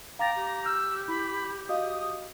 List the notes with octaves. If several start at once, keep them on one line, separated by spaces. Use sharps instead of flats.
F5 G5 A#5 D6 A6
G4
E6 F6 G6
E4 B5
F#4 D#5 F5 D#6